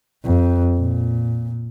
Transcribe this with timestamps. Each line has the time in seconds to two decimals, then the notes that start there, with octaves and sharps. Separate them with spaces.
0.24 F2
0.77 A#2